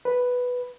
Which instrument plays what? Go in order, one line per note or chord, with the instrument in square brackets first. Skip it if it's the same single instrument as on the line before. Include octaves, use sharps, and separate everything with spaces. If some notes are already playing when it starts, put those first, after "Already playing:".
[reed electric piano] B4